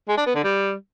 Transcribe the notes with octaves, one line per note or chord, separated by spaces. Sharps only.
G#3
D4
B3
D3
G3